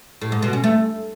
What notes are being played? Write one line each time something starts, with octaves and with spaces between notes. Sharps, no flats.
A2
G#2
B2
C#4
A3